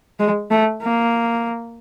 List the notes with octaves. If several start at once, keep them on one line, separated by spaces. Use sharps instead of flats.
G#3
A3
A#3